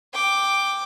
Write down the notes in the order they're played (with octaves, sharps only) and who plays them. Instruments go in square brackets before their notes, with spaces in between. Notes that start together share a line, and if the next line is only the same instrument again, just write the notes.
[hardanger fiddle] G5 D6